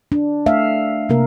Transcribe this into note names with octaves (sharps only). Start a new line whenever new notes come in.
D4
A3 E5 F5
C3 A#3 A#4